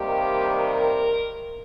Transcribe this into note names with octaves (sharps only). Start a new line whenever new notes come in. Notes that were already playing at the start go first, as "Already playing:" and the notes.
Already playing: C3 D#3 G3 A#3 G4
A#4